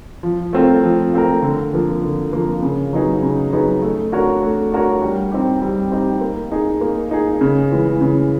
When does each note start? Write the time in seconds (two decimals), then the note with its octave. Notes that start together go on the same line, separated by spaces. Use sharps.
0.23 F3
0.53 A3 C4 F4 A#4
0.83 F3
1.13 A3 C4 F4 A#4
1.42 D3
1.73 F3 A#3
2.03 D3
2.33 F3 A#3
2.62 C#3
2.93 F#3 B3 D#4 G#4
3.23 C#3
3.53 F#3 B3 D#4 G#4
3.82 A3
4.12 D4 F#4 A#4 C#5
4.42 A3
4.72 D4 F#4 A#4 C#5
5.02 G3
5.32 C4 D#4 G4
5.62 G3
5.92 C4 D#4 G4
6.21 A#3
6.52 D#4 G#4
6.81 A#3
7.11 D#4 G#4
7.41 C#3
7.71 E3 G#3
8.01 C#3